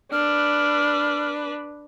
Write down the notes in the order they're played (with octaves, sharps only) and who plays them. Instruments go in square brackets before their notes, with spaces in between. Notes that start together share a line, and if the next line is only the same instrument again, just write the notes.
[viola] D4 B4 [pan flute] F6